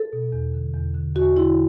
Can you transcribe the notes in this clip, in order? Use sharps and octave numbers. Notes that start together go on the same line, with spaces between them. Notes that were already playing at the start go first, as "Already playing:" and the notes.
Already playing: A4
B2
E2
D3
E2
D3
E2 F#4
D3 E4